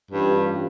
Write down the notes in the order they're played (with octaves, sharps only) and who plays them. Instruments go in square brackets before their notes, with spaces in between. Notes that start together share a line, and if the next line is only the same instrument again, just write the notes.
[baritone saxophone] G2 [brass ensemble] E3 A3 C#4 F4